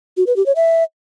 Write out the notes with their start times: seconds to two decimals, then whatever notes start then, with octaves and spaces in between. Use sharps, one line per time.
0.17 F#4
0.27 B4
0.36 G4
0.46 C#5
0.56 E5